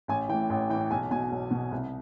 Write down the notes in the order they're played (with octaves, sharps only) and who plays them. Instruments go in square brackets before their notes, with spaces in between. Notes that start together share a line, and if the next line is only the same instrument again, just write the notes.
[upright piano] A1 G#5
E3 G5
A2
A1 G5
A2 E3 G5
B1 G#5
B2 G#5
B1
B2
C2